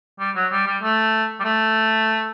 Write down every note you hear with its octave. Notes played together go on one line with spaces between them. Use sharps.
G3
F#3
G3
G3
A3
G3
A3